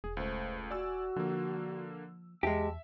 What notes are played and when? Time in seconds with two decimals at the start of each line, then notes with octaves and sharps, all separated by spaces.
0.04 E1 G#4
0.17 C#2 A3 C5
0.71 F#4 D5 G#5 E6
1.16 D3 F3 A#3
2.43 E2 G#3 G4 E5 A5